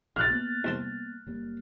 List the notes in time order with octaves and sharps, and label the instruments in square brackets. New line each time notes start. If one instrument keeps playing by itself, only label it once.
[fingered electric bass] A#1 [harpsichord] C#3 [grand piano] F6 F#6 A6
[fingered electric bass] A#3 B3
[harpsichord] C2 C4 A5
[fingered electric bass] F#1 G3 A#3